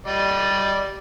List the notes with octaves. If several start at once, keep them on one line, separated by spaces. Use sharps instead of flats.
G3 D5 D#5